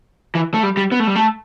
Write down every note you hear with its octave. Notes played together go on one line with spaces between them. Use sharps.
E3
A3
G3
G3
B3
A3
G3
A3